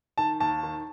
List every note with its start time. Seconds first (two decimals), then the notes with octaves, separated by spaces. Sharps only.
0.18 D#3 A5
0.40 D#2 A5
0.63 D#3